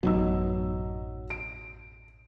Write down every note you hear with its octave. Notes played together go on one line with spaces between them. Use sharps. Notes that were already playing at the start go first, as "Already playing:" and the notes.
A1 F#2 B2 F#3 D#4 E6
D7